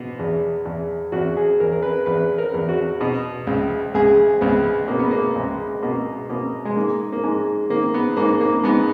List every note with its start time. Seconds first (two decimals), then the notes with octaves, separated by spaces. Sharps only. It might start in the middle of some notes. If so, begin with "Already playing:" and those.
Already playing: B2
0.19 E2
0.65 E2
1.12 E2 F#4
1.37 G#4
1.60 E2 A#4
1.72 A#4
1.83 B4
2.06 E2 B4
2.38 A#4
2.54 E2
2.69 F#4
3.01 B2
3.47 C#2
3.94 C#2 G#4
4.41 C#2 B3
4.88 B2 A#3
4.99 B3
5.11 A#3
5.35 C#2 G#3
5.82 B2 A#3
6.29 B2 A#3
6.65 G#3
6.76 G#2 A#3
7.13 A#3
7.23 G#2 G#3
7.70 D#3 A#3
7.94 B3
8.17 G#2 A#3
8.41 A#3
8.64 G#2 B3